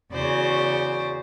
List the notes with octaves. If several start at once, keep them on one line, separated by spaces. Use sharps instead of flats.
E2 C#3 F#4 C5 D5